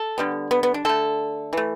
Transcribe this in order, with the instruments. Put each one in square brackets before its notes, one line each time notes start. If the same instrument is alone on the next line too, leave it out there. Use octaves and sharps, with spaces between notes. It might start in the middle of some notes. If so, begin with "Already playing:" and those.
Already playing: [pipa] A4
D3 G3 B3
B3
B3
D4
D3 A3 A4
E3 A3